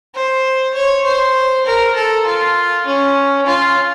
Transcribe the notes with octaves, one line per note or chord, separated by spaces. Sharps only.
C5
C#5
C5
A#4
A4
F4
C#4
F4